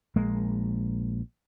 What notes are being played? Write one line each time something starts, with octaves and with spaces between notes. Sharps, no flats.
A#1 G#3 A#3